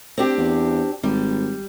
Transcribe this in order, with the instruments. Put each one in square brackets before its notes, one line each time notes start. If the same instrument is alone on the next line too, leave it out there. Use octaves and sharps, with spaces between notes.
[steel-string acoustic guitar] C4 D4 G4
[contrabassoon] E2
[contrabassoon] G#1 [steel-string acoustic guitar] G3